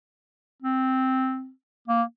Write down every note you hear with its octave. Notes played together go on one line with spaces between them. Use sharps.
C4
A#3